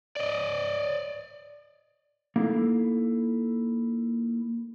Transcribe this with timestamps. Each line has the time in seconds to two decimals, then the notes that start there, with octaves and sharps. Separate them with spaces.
0.16 D5 D#5
2.36 A#3 D#4 E4 A4 F5